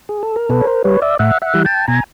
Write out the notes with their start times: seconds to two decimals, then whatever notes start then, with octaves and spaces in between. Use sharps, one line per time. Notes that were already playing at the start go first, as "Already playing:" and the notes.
0.09 G#4
0.23 A4
0.36 A#4
0.49 B2 A4 B4
0.61 C#5
0.67 A#4 C5
0.84 G3 B4 C#5
1.02 D5 E5
1.19 A2 E5 F#5
1.42 E5 F#5
1.54 E3 G3
1.65 G5 A5
1.88 B2 G#5 A#5